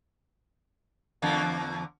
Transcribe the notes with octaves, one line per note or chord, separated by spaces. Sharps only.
E2 D3 A#3